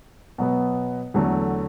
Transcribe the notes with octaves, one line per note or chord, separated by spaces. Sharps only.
B2 F#3 B3
E2 D3 F#3 A3